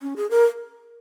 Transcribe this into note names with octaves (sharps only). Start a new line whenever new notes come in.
C#4
G#4
A#4